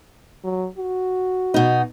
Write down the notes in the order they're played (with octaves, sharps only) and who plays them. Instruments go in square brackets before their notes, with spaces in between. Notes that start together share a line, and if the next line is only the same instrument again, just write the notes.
[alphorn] F#3
F#4
[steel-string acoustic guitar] B2 D#4